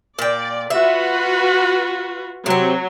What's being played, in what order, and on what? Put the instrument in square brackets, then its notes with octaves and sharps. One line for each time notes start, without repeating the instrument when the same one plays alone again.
[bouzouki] A#2 G5 [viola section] D5
[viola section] F4 F#4 B4 [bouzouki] E5
[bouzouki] C3 C4 [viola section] F#3